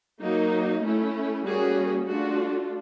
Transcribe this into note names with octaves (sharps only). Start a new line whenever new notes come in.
F#3 A#3 D#4
A3 C#4 E4
G3 A#3 C#4 F#4 G#4
A3 D4 F4 F#4